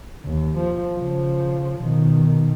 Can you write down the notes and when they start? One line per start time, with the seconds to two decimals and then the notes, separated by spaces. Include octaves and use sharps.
0.25 D#2
0.58 F3
0.98 C#3 F3
1.81 B2 D#3